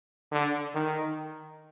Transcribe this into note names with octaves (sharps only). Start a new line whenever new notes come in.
D3
D#3